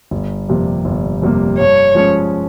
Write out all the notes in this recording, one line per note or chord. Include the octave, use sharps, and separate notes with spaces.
G1
F2 C3 G3 A#3
G1
F2 C3 G3 A#3
G2 C#5
F3 G#3 C#4